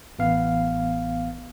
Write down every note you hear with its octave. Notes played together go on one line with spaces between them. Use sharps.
A1 B3 F5